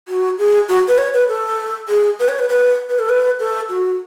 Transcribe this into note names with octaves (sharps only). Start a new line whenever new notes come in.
F#4
G#4
F#4
B4
C#5
B4
A4
G#4
B4
C#5
B4
B4
B4
A4
B4
A4
F#4